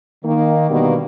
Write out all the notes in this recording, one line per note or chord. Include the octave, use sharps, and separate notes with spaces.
D#3 A#3
B2 D3 D#3 G3 A#3 B3